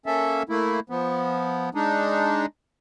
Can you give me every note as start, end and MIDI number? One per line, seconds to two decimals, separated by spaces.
0.06 0.43 58
0.06 0.43 61
0.06 0.43 69
0.06 0.43 76
0.49 0.80 57
0.49 0.80 58
0.49 0.80 64
0.90 1.69 53
0.90 1.69 59
1.75 2.46 56
1.75 2.46 62
1.75 2.46 63